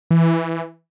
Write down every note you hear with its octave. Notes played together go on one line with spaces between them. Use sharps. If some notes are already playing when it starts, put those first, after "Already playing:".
E3